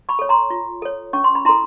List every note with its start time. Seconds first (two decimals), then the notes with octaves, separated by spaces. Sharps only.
0.09 B5 C#6
0.19 A4 C#5
0.29 A#5 C6
0.50 F4
0.82 A4 C#5
1.13 C#4 C#6
1.24 C6
1.35 B5
1.45 E4 A4 A#5 C6